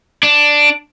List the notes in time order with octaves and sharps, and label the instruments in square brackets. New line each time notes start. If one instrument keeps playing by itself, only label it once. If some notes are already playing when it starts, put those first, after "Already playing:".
[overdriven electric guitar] D4